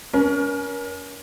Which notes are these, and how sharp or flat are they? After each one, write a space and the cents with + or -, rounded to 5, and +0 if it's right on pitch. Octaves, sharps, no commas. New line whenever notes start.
C#4 +30 A#4 +35